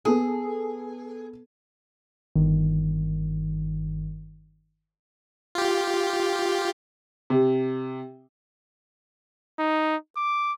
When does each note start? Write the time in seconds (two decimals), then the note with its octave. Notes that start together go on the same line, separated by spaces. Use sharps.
0.05 B3 G#4 A4
2.35 G1 D#3
5.55 F4 G4
7.30 C3
9.59 D#4
10.16 D6